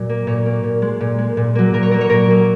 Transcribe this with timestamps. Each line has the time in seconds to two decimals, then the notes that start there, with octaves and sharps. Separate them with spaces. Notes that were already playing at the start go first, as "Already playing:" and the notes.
Already playing: A#2 F#3
0.09 A#3
0.27 A#2 C#5
0.46 A#3
0.64 A#2
0.82 G#3
1.01 A#2
1.18 G#3
1.37 A#2
1.55 F#3 A#3
1.73 A#2 A#4
1.83 C#5
1.91 F#3 A#3 A#4
2.01 C#5
2.10 A#2 A#4
2.28 F#3 A#3